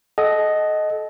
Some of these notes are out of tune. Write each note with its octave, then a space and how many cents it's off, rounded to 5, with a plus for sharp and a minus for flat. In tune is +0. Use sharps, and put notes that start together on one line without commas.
A4 -30 D#5 +0 F#5 +15